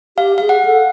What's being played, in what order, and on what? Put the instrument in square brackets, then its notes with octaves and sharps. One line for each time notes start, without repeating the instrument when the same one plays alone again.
[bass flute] G4 [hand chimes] F5
[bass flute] G#4 [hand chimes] F5
[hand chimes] F#5
[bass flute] A4